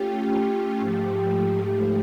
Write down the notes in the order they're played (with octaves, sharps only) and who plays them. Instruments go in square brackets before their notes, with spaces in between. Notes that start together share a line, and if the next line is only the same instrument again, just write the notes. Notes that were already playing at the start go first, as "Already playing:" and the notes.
Already playing: [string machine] A3 C#4 F4 [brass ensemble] G4
[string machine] G#2 F3 A3
[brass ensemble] G4